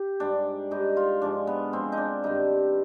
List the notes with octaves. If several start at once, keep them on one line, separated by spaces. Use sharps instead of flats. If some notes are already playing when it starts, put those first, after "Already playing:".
Already playing: G4
G#2 G3 D4
G#2 G3 D#4
F4
G#2 F3 G#3 D4
B3
G#2 F3 G#3 C4
D#4
D4
G2 D#3 G3 D#4